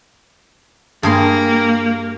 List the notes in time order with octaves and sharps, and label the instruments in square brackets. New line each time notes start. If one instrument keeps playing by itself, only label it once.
[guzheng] G2 G#4 C6 [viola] A#3